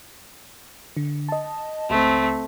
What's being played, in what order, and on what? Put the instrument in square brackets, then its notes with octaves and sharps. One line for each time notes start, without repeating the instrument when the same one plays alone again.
[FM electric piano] D3
D#5 A5
[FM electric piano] C#2 [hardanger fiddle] A3 C4